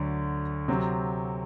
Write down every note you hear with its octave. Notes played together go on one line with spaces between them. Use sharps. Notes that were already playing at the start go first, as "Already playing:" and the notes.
Already playing: D2 D3 F#3
C3 F#3 C4